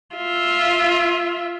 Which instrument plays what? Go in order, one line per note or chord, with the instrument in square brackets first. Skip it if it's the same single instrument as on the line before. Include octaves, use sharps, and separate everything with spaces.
[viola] F4 E5